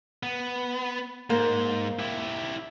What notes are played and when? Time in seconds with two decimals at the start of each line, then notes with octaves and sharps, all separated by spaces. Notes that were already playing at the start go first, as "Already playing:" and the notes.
0.23 B3
1.30 G#2 A#3 C5
1.99 E4 G4